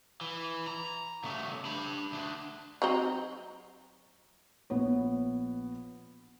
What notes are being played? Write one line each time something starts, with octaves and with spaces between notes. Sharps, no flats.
E3
A#5
C#3 A3
D4 B5
D2 D4
F#3 C4 D#4
A#1 B3 C#5